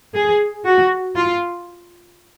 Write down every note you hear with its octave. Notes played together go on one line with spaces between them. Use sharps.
G#4
F#4
F4